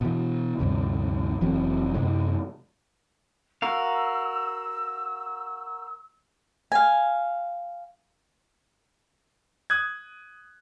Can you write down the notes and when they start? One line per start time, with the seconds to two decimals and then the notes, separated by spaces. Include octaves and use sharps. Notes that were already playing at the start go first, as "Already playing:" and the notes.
0.01 B2 E3
0.59 D2 G2 C3
1.41 F1 E3 F#3 C4
1.94 F#2 C3 G#3
3.62 F#4 A#4 F5 E6
6.72 F5 G#5
9.70 D#6 F#6 G#6